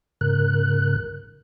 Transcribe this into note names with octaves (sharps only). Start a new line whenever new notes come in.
G#2 C#3 A#4 F#6